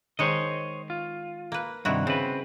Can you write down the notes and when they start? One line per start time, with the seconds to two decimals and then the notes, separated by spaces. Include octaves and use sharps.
0.19 D#3 G#3 C5 C#5 D#5
0.90 F4
1.52 A#3 B4
1.85 G2 C3 D#3 E4 F#4
2.07 C#3 C4 B4